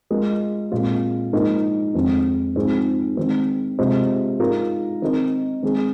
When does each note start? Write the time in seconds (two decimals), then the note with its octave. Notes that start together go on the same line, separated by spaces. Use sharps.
0.10 G#3 F4 A#4 D#5
0.72 A#2 G#3 C4 F4
1.33 G#2 F3 A#3 D#4 A#4
1.94 F2 D#3 G#3 C4
2.56 G#2 F3 C4 G#4
3.17 D#3 G#3 C4
3.79 C3 G#3 F4 C5 D#5
4.40 G#2 G#3 F4 A#4
5.02 D#3 C4 D#4 A#4 D#5
5.62 D#3 G#3 C4 G#4